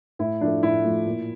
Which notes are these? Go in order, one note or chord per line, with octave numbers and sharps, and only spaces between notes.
A2 E4
F3 A3 D4
A2 E4
F3 A3
A#2